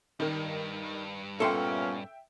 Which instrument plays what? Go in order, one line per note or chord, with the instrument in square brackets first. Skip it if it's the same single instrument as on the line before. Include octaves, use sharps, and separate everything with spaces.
[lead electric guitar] G2 [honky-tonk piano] D#3 A#4
[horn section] A#2 B3 C#4 [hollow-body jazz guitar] A4 C6 [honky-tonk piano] E5 G5